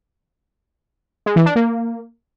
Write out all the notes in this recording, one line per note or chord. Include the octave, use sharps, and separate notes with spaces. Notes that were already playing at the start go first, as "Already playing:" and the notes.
G#3
E3
D4
A#3